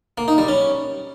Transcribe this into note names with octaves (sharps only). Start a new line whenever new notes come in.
A#3
D#4
G3
C#4